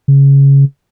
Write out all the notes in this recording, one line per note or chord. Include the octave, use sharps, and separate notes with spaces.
C#3